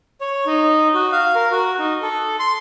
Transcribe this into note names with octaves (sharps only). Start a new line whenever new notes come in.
C#5
D#4
F#4
F5
A#4
F#4
D#4
A4
C6